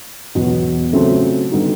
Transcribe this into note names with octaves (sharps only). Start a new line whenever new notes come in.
E2 B2 F#3 B3
C#3 F#3 A3 C4 F4
D3 G3 B3 D#4 F#4